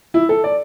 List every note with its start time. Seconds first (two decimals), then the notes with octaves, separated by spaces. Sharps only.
0.14 E4
0.29 A4
0.44 D5